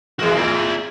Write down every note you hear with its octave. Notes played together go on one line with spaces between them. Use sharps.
E3 G#3 A#3 C4 F#4
A2 E4 D5